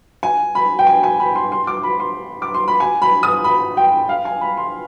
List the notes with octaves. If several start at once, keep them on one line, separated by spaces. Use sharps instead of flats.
G#5
B5
G5
G#5
G#5
B5
C6
C6
D6
B5
C6
D6
C6
B5
G#5
B5
D#6
B5
G5
F5
G#5
B5
C6